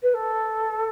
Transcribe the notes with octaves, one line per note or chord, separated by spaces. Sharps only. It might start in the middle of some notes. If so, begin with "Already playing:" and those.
B4
A4